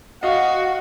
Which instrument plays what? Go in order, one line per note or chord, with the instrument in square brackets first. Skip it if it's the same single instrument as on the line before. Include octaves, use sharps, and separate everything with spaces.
[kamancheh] F#4 [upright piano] D#5 F5